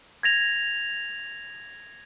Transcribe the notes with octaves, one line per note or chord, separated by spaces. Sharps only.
G#6 A#6 F7